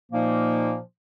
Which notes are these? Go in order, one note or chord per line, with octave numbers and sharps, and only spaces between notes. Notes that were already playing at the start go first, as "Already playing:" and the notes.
A#2 F3 A#3 D#4